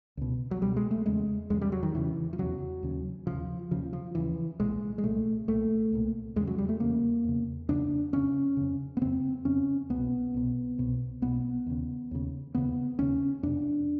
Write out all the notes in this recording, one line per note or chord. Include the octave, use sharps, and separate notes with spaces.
C#2 B2
F#3
C#2 B2 G3
G#3
A3
E2 C#3 G#3
E2 C#3 G#3
G3
F#3
D#3
E2 C#3 E3
F3
E2 C#3 F#3
D#2 C#3
D#2 C#3 F3
D#2 C#3 F3
F3
D#2 C#3 E3
C2 A#2 G#3
G#3
C2 A#2 A3
C2 A#2 A3
C2 A#2
E2 C#3 G#3
F#3
G3
A3
E2 C#3 A#3
E2 C#3
E2 C#3 D4
F2 C#3 C#4
F2 C#3
B3
F2 C#3 C4
F2 C#3 C#4
C2 B2 B3
C2 B2
C2 B2
C2 B2 B3
D#2 C#3
D#2 C#3
D#2 C#3 B3
D#2 C#3 C#4
F2 C3 D4